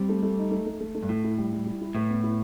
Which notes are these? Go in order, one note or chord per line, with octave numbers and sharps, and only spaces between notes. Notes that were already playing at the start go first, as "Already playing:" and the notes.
Already playing: G3 C4
A3
A3
D#4
A3
A3
A3
A3
G2
A2 E4
E4
G3
G3
E4
E4
A2 B4
B3
E4